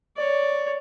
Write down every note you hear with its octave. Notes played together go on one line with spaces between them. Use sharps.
C#5 D5